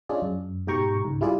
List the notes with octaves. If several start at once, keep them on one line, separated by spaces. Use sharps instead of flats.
G#3 C#4 D4 F4 G#4 D5
F#2
G#2 B2 G4 G5 A#5 C#6
C#2 G#2
G3 E4 F4 G#4 D5